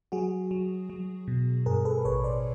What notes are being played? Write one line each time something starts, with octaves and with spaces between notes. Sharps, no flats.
F#3 F#4 G#4
F#3
F#3
B2
G2 G#4 A#4
A4 B4
A1 B4 C#5
C5 D5